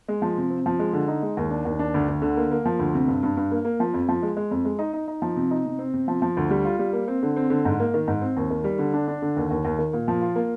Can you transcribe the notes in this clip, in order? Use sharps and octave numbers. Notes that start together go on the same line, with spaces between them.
G#3
F3
C3
C4
F3
G#3
D3
D#4
G#3
D#2
D4
D#2
D4
D2
D2
D3
A#3
A#3
F3
D2
C3
G2
G2
G2
A#3
A#3
F3
F2
F3
G#3
G#3
F2
G#3
D#4
D#4
D#4
F3
C3
D#4
C3
C4
C3
F3
F3
D2
G3
F4
G3
A#3
C4
D3
C4
D3
G#2
A#3
D#3
G#2
C4
D#2
D#3
G3
D3
D4
D4
D3
D#2
D#2
D#2
D#3
A#2
F3
F4
A#3